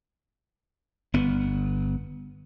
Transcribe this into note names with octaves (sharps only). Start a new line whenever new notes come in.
G1 B3